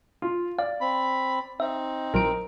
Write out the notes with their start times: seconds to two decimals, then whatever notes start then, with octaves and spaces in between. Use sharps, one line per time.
0.22 F4
0.59 D5 F5
0.81 C4 B5
1.60 C4 D#4 E5
2.14 A#1 F#3 A#4 D7